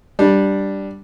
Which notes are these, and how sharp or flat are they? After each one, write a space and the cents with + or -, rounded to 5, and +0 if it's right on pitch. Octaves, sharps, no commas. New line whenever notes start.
G3 +0 D4 +0